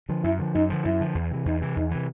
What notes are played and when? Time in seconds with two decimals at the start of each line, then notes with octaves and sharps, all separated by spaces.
0.09 D3 F3
0.24 F#2 E4
0.39 D3 F3
0.55 F#2 D#4
0.70 D3 F3
0.85 F#2 E4
1.00 D3 F3
1.15 E2
1.31 C3 E3
1.46 E2 D#4
1.62 C3 E3
1.76 E2 D#4
1.91 C3 E3